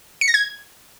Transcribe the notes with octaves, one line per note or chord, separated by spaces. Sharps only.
C#7
A#6
G#6